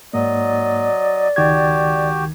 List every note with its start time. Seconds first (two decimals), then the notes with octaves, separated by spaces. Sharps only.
0.13 G#2 F#3 A#3 D5 D#5
1.36 C#2 D#3 F#4 G4 G#6